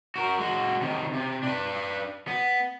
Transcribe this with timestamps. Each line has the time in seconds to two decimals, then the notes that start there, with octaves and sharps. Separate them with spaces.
0.16 F#4 A#4
0.39 G#3 F#4
0.82 C3 D#3
1.13 C3
1.43 D4 B4
2.27 B3